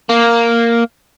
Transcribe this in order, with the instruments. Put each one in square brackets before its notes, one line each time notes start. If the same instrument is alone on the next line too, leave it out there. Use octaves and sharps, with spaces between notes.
[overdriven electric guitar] A#3